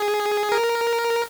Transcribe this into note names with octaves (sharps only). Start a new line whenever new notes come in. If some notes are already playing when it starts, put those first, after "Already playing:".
Already playing: G#4
A#4